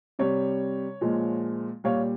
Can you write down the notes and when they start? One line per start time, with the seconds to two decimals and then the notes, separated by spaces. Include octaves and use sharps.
0.19 C3 G3 C#5
1.01 A#2 F3 G#3
1.84 A#2 G3 C#5 F5